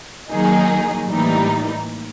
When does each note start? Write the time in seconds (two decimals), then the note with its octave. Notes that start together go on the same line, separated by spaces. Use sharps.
0.31 D#3 F#3 A#3 D#4 G#4
1.08 A2 E3 G3 A#3 D#4